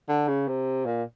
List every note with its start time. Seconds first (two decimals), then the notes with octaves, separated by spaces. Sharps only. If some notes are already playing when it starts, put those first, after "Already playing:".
0.09 D3
0.28 C#3
0.48 C3
0.86 A#2